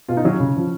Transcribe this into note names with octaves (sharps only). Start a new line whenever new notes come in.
B2 F4
D#4
F#3 C#4
C#3
F3